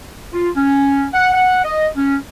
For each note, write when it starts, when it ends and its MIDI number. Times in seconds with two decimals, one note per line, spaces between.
0.33 0.50 65
0.56 1.06 61
1.14 1.33 78
1.34 1.60 78
1.64 1.88 75
1.96 2.16 61